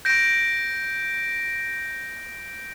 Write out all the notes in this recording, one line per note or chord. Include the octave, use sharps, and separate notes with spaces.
G6 A#6 D7